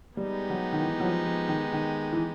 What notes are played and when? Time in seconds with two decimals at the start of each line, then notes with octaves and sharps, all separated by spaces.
0.17 G3 G#3 B3 D#4 G4
0.50 F#3
0.72 D#3
0.82 E3
1.00 F#3
1.04 F3
1.26 F3
1.48 D#3
1.73 D#3
2.12 E3